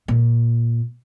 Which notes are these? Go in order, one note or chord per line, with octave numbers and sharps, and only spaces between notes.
A#2